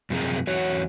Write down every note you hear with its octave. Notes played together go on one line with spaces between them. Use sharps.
F#2 C3 F3 G#4 A#5
E2 F#4 C#5